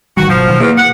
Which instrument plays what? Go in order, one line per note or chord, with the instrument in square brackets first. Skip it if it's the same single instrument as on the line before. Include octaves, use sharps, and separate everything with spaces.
[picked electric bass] A1 D#3 G3 [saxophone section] F#4
[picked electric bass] G1 B2 F#3 [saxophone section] F3
[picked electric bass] B2 D#3 F#3
[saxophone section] E2 [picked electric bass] A#3
[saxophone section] F#5